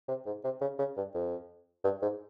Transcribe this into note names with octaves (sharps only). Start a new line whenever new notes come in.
C3
G#2
C3
C#3
C#3
G2
F2
G2
G#2